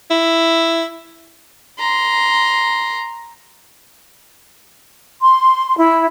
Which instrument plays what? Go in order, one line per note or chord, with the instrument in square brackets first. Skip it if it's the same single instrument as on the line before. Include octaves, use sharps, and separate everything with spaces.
[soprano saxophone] E4
[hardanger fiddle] A#5 C6
[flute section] C6
E4